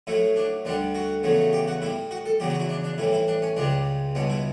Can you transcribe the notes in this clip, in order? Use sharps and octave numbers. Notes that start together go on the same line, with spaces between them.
A2 F#3 A3 E4
D4
D2 D3 G3 D4
F#4
E2 C#3 F#3 A3
G4
F#4
A2 G3 E4
F#4
A4
E2 C#3 F#3 G4
F#4
E4
D4
D4
A2 E3 G3 E4
E4
D4
C#4
C#2 C#3 G3 D4
C#2 B2 G3 C#4
E4